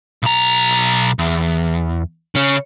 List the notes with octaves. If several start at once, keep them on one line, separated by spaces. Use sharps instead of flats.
B1 A#5
E2
C#3 C#4